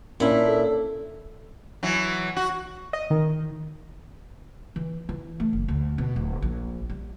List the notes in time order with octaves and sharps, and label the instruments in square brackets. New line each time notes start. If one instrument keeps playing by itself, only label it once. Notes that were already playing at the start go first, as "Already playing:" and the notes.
[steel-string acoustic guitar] A#2 E4 [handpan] A#3 C#4 D4
[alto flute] A4
[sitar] E3 F#3
F#4
[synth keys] D#5
D#3
[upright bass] E3
E3
A3
F#1
D2
B2
D1
A#1
G3